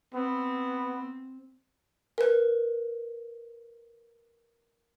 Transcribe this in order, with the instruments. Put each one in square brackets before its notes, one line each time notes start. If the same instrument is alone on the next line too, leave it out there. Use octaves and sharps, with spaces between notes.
[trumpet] B3 [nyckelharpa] C4
[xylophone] A#4 B4